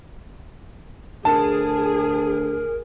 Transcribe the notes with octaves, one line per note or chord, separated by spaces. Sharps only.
D2 G#4 A#4 A5